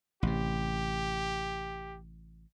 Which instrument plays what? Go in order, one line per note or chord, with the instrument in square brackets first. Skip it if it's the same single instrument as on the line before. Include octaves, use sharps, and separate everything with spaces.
[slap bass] A1 C3 [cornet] G4